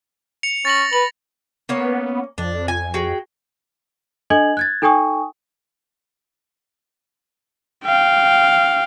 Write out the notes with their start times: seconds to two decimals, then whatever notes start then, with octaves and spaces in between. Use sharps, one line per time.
0.43 C#7 F7
0.65 C#4 A6 A#6 F#7
0.93 B4 F#7
1.69 A#3 B3 C#4 C#5
2.38 F2 D4
2.68 G#5
2.94 F#4 G#4 G5
4.30 D4 A4 D#5 G#5 G#6 F#7
4.57 F#6 G#6 A6
4.82 D#4 A4 G5 G#5 C#6 D#6
7.85 F5 G5